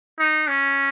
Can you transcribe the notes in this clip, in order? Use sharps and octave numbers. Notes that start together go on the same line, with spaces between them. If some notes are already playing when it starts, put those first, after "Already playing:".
D#4
C#4